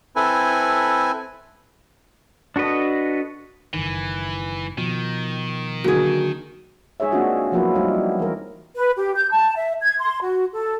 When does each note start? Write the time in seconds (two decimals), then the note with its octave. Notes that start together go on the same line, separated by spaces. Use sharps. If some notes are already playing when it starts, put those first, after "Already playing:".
0.16 C4 E4 A4 B4 G#5
2.56 D4 F#4 A4 B4 D#5
3.74 F#1 B1 D#3 E3
4.78 B2 D#3 F3
5.84 D3 F#3 A#3 F#4 G#4
7.00 G#3 D#4 G#4 C#5 E5
7.12 A#3 C4 D4 F4 F#4 E5
7.52 F3 F#3 A#3 B3 E4 F4
7.75 G3 A3 D#4
8.19 E3 A#4
8.75 B4
8.96 G4
9.15 G6
9.32 A5
9.55 E5
9.81 G#6
9.99 C6
10.21 F#4
10.53 A4